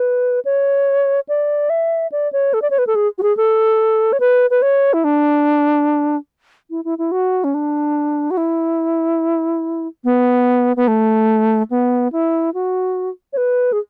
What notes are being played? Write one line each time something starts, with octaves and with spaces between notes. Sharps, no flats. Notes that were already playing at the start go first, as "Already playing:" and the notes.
Already playing: B4
C#5
D5
E5
D5
C#5
A4
D5
C#5
B4
A4
G#4
F#4
G#4
A4
C#5
B4
B4
C#5
E4
D4
E4
E4
E4
F#4
C#4
D4
F#4
E4
B3
B3
A3
B3
E4
F#4
C#5
B4
G#4